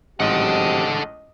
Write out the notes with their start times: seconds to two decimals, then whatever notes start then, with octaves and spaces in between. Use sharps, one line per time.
0.20 A1 G#2 F#3 C4 G4 A4 D#5 F#5